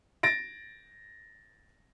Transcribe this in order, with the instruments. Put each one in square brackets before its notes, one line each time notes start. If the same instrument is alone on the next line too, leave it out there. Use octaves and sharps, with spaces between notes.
[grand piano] A6 A#6 D7